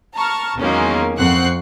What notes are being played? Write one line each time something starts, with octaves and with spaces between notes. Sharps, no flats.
A5 A#5 C#6 F6
E2 D#3 F#3 G#3 A#3 C#4
F2 C4 F#5 C#6 F#6 C7